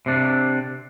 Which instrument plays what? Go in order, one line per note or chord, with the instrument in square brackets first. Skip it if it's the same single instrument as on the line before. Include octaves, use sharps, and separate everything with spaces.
[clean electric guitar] C3 D4